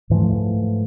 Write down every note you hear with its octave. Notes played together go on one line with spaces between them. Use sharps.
G#2 E3 F3 A3